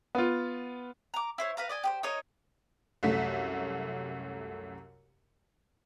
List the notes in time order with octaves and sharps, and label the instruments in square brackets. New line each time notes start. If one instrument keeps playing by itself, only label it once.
[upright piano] B3 F4
[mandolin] A#5 D6
E4 C5 C#5
B4 F5 A#5
D5 D#5 G#5
G4 B4 C5
D#4 A#4 C#5 D#5
[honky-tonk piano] C2 F#2 A3 B6